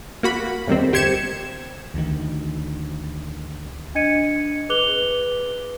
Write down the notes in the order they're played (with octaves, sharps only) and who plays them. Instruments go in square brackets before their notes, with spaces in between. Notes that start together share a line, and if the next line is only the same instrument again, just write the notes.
[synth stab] A#3 F#4 B5
E2 G2 D#3 C4
D2 G4 C5 G#6 C#7 E7
[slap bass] D2 D#3
[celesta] D4 D#5 G#6 C#7 D#7
G#4 B4 D6 F#6 F7 G7